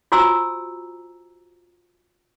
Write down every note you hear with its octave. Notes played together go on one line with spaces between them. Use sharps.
F4 F#4 C5 G#5 A#5 E6